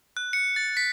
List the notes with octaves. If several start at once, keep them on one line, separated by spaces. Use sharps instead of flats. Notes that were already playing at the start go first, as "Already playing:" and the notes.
F#6
C#7
A6
B6